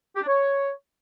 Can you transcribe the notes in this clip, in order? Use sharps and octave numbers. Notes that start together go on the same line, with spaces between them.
G4
D4
C#5